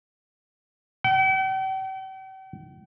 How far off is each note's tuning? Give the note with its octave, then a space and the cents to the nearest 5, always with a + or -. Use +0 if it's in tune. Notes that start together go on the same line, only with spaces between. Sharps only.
G5 -45